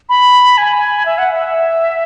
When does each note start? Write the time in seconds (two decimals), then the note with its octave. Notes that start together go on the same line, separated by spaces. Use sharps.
0.09 B5
0.58 G#5
1.06 E5
1.18 F#5
1.33 E5